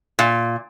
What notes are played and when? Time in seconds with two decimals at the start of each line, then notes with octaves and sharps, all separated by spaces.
0.19 A#2